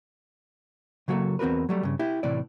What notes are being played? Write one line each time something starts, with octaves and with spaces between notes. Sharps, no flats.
C#3 F#3 A#3 F#4 A4
E2 C4 F#4 A#4 B4
F#3 G3 A3
G2 C#3
E4 G4
A2 C3 E3 D5